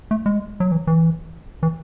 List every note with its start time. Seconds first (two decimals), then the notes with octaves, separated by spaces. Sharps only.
0.11 A3
0.26 G#3
0.60 F#3
0.72 E3
0.87 E3
1.63 E3